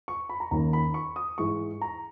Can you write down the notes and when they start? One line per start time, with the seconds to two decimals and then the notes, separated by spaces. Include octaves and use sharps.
0.08 C#6
0.29 B5
0.40 A#5
0.51 D#2 D#3 A#3 C#4 A#5
0.73 B5
0.94 C#6
1.16 D#6
1.38 G#2 E3 G#3 C#6
1.81 A#5